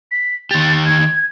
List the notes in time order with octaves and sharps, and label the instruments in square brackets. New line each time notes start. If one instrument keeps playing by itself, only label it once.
[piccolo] B6
[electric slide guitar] D#3 G4 [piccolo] A6
[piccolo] G#6